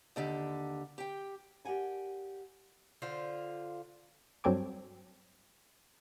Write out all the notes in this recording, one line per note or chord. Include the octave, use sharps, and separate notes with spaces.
D#2 D3 G4
G4 G5
G4 A#4 D5 F#5 G#5 A5
D3 F4 C5
G2 F#3 C4 A4 G#5 D6